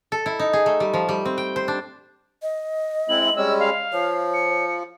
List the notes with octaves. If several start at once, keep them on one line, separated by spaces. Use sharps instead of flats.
A4
E4
D#4
G#4
A3
G3
F3
G3
C4
G5
C5
D4
D#5
G#3 C4 E4 F#7
G3 G#3 C#4 E6
F5
F3 C#5
C#7